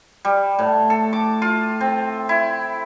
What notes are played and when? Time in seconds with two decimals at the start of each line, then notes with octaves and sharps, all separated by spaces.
0.25 G3
0.59 A2
0.90 A4
1.13 D6
1.42 F4
1.81 C4
2.29 E4